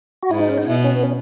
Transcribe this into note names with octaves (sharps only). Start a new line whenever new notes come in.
F#4
G#2 E4
D#4
C#4
D#4
B2 E4
C#4
B3
C#4